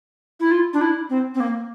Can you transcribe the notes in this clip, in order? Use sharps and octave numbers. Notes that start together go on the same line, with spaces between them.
E4
F4
D4
E4
C4
C4
A#3